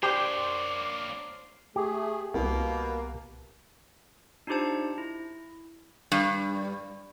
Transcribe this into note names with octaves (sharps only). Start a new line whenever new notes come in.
A#3 D4 G4 C5 C#5 G5 C6 D6
A3 G4 G#4
C2 B2 A#3
D4 D#4 F4 G4 C5 A5
E4
G2